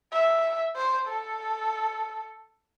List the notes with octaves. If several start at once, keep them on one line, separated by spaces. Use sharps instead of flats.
E5
C5
A4